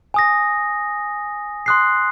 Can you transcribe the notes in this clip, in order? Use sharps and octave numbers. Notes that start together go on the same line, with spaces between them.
G#5 D#6 A#6
C6 D#6 F#6 C7